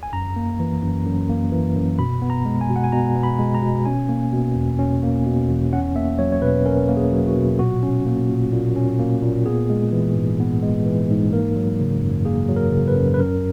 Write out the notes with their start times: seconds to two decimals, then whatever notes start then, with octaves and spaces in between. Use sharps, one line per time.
0.03 G#5
0.13 F#2 A#5
0.36 A#3
0.60 E3
0.82 F#2
1.06 F#2
1.29 A#3
1.52 E3
1.76 F#2
1.99 B2 B5
2.22 B3
2.30 A#5
2.45 G#3
2.61 G#5
2.70 B2
2.76 F#5
2.84 G#5
2.92 B2 A#5
3.16 B3
3.23 B5
3.39 G#3
3.55 A#5
3.62 B2
3.85 C#4 G#5
4.09 A#3
4.33 B2
4.55 E2
4.79 C#4
5.03 A#3
5.26 B2
5.48 E2
5.72 C#4 F#5
5.95 A#3 E5
6.19 F#3 C#5
6.32 C#5
6.42 B2 B4
6.66 C#4 A#4
6.89 A#3
6.97 G#4
7.12 F#3
7.27 F#4
7.36 B2
7.59 A#2 F#4
7.83 C#4
8.06 A#3
8.29 A#2
8.52 A#2
8.76 C#4
8.99 A#3
9.22 A#2
9.46 B3 G#4
9.70 G#3
9.92 E3
10.16 G#2
10.40 B3
10.62 G#3
10.86 E3
11.10 G#2
11.32 A#3 A#4
11.56 F#3
11.80 C#3
12.02 F#2
12.25 A#3 G#4
12.49 F#3
12.56 A#4
12.72 C#3
12.88 B4
12.96 F#2
13.14 B4
13.19 F#2 A#4